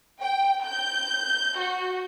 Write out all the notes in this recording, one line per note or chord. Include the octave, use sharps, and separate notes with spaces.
G5
G6
F#4